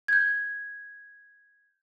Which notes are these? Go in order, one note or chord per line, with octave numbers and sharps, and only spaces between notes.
G6 G#6